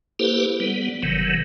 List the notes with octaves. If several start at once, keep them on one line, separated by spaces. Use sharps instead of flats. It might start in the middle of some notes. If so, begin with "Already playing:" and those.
A#3 E4 G4 A4 B4 C5
G3 B3
F#1 C3 D#3 E3 F#3